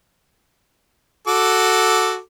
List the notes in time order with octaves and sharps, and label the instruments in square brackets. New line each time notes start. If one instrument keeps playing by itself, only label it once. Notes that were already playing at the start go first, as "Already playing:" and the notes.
[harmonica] F#4 A4 D6